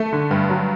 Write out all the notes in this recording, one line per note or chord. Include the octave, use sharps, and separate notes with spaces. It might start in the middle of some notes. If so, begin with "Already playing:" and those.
Already playing: A3
D3
G2
F#3